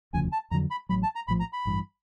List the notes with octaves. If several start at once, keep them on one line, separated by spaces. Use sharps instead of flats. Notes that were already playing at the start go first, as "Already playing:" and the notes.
E1 D2 C#3 F3 G#5
A5
F2 D3 F#3 A#5
B5
A1 A2 F#3 B5
A5
A#5
A#1 A2 F3 B5
A#5
B5
A1 G2 E3